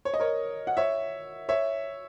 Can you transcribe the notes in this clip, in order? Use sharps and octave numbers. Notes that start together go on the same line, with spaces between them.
C#5
D#5
A#4 C#5
F#5
C#5 E5
C#5 E5